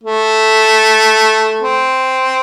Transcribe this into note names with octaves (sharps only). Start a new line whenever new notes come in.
A3
C4